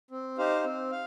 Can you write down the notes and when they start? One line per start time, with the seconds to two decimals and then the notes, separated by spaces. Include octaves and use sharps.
0.11 C4
0.38 D#4 G4 C5 F5
0.64 C4
0.92 F5